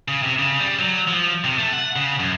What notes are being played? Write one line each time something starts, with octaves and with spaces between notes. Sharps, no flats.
C#3
C3
C#3
G3
F#3
F3
C3
A3
F#5
C#3
F#2